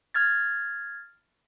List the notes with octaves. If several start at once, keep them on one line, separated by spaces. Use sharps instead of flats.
F6 G#6 A6